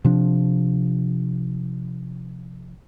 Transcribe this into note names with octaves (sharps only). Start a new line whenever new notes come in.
C3 F3 D4